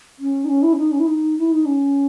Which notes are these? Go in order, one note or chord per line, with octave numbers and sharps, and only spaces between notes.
C#4
D#4
C#4
E4
C#4
D#4
C#4
E4
D#4
E4
D#4
C#4